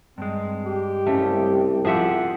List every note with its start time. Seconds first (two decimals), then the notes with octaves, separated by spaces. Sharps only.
0.18 G2 G#3 C4
0.65 G4
1.07 C2 C#3 A3
1.85 F3 G4 G#4 E5 F#5